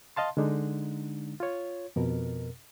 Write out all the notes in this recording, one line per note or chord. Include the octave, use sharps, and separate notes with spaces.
D#5 F5 A5 C6
D3 G#3 D4 D#4
F4 C#5
F2 B2 A#4